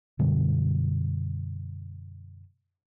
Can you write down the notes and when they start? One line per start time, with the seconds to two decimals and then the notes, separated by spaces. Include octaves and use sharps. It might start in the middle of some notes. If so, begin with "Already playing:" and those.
0.19 F#2 B2 D3 G3